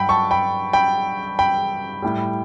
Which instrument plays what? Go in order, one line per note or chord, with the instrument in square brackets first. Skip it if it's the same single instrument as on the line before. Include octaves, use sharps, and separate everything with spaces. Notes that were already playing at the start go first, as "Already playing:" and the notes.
Already playing: [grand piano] G2 F#3 F#5 G5 B5
A5 C#6
G5 B5
G5 B5
G5 B5
A2 G3